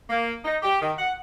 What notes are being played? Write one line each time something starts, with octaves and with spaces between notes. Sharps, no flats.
A#3
D#4
G4
D#3
F#5